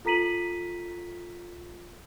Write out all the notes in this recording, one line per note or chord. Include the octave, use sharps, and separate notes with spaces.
F4 A4 A#5 B6 D#7 F#7